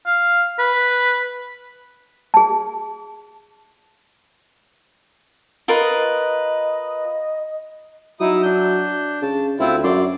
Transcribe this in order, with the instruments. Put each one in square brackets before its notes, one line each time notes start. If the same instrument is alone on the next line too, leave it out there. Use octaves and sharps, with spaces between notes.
[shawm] F5
B4
[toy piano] G#4 A5
[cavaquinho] F4 A#4 B4 [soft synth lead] D#5
[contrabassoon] F#3 [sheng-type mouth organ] D#4 E4 D#6
[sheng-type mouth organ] D4 G6
[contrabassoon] C#3 [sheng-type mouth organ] A5
[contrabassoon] D2 [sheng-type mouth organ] C4 E4 F4
[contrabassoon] F#2 [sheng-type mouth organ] D5 C6